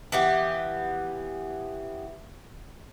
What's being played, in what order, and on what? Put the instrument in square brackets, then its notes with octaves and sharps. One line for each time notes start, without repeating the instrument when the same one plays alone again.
[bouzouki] E3 B3 G4